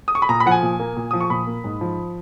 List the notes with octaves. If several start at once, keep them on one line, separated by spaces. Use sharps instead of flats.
D#6
C#6
B5
A#2 A#5
B5
F3 F#5
G#5
A#2
A#3
A#2
F3 D#6
C#6
A#2 B5
A#3
G#2
F3